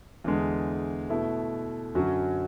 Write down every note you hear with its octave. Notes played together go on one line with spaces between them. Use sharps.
E2 D3 G#3
B2 A3 E4
F#2 D3 F#3 C#4 F#4